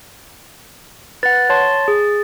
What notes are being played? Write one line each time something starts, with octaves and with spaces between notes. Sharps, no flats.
B4 F#5 A6
C#5 A5 C6
G#4